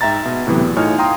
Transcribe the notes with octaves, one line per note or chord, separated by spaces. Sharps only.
G#2 E5 G5 A#5 A6
B2
A2 C3 E3 F#3 B3
E2
A2 D#4 F4 C#5 G#5 F6
F5 G5 A#5 C6 D#6